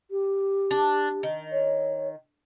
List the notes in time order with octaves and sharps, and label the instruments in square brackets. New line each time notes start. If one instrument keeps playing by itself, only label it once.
[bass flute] G4
[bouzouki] D4
D#3
[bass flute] C#5